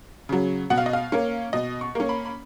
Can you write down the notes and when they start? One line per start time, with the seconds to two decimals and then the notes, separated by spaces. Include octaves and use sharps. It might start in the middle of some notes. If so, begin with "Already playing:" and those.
0.29 C#3 F#3
0.70 B2 F#5
0.78 F5
0.86 D#5
0.93 F5
1.12 A#3 C#4
1.53 B2 D#5
1.81 C#6
1.95 A#3 C#4
2.09 B5
2.26 B5